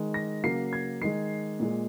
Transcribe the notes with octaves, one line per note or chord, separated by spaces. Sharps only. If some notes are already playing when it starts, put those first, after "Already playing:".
Already playing: D#3 G#3
A#6
C#3 F#3 A#3 C7
G#6
D#3 G#3 C7
A#2 G#3